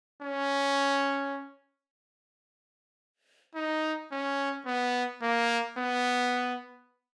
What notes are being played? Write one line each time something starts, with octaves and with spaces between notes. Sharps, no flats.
C#4
D#4
C#4
B3
A#3
B3